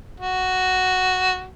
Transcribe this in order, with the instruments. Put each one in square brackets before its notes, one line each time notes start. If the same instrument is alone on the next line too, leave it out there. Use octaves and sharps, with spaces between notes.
[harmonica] F#4